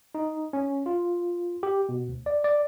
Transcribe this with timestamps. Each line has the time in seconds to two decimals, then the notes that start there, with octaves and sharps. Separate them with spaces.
0.15 D#4
0.53 C#4
0.86 F4
1.63 G4
1.89 B2
2.08 D2
2.26 D5
2.44 D5